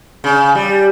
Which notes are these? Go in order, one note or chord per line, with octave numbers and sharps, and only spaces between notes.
C#3
G3